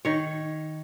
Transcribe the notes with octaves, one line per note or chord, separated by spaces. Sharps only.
D#3 C#5